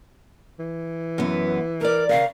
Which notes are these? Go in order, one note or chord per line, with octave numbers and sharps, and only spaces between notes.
E3
F#2 B3
A#4 D5 A#5
C#3 A#4 F5